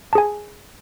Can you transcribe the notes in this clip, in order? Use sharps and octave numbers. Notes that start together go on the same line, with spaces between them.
G#4 G#5 A5